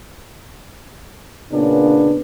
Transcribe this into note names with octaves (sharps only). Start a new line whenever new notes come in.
A#2 C#3 B3 C#4 D4